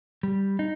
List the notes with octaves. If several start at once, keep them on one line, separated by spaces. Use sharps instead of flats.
G3
D#4